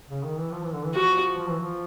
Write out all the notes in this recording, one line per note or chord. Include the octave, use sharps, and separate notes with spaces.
C#3
D#3
E3
F3
E3
D3
E3
F3 F#4
F3
E3
F3